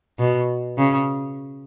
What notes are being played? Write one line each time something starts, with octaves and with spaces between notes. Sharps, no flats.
B2
C#3